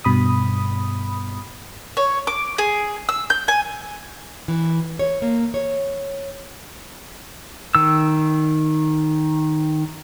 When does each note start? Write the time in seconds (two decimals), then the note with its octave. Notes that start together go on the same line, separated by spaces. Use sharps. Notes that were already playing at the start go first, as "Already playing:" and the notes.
0.04 G2 B2 B5 D#6
1.97 C#5
2.27 D6
2.58 G#4
3.09 E6
3.30 G6
3.48 G#5
4.48 E3
4.99 C#5
5.22 A#3
5.54 C#5
7.75 D#3 E6